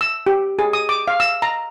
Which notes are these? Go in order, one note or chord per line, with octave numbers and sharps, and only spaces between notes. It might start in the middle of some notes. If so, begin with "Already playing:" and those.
E6
G4
G#4
D#6
D6
F5
E6
A#5